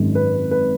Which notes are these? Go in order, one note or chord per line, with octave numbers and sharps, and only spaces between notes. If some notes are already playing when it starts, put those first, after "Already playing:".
Already playing: G#1 F#2 D#3 G#3
B4
B4